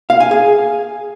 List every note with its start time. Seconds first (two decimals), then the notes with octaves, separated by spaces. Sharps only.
0.10 F5
0.20 G#5
0.31 G#4